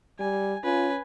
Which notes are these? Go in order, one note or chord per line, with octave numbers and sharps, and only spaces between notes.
G3 G#5
C#4 F4 B4 G#5